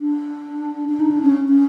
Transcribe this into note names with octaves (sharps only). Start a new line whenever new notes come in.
D4
D4
D#4
D4
C#4
C#4